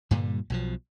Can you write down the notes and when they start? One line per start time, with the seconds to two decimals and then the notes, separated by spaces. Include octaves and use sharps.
0.11 G2 A#2 D3 G3
0.50 B1 B2 F3